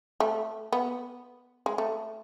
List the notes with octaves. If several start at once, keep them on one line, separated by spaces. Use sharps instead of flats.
A3
B3
G#3
A3